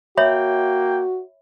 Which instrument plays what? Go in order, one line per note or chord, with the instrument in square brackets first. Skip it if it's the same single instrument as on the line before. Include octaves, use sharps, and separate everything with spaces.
[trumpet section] A#3 G5 [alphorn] F#4 [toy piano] C#5 E5 B5